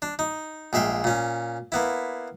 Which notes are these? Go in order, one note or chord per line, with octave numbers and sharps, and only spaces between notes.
D4
D#4
A#1 G#3 E5 F5 G5
A#2 C#4
A#3 B3 E4